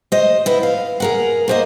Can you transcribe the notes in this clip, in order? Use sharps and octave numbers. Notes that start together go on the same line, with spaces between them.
C5 D#5
B3 E4
F5
G#4 A#4 F#5
A#3 C5 D#5